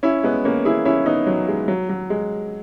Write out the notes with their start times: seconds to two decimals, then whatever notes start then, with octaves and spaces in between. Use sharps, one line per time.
0.03 C#4 E4
0.23 G#3 B3
0.45 A#3 C#4
0.65 E4 G#4
0.85 C#4 E4
1.06 B3 D#4
1.27 F#3
1.48 G#3
1.68 F#3
1.89 F#3
2.10 G#3